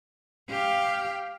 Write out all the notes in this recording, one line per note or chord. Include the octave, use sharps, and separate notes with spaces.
G4 F5